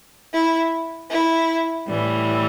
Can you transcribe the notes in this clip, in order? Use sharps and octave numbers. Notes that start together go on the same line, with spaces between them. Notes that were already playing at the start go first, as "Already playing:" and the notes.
E4
E4
A2 E3 G3